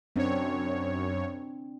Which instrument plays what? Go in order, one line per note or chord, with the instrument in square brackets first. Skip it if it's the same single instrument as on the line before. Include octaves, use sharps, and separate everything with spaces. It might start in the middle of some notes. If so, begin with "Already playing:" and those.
[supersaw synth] F#2 C#5 [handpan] C4 D4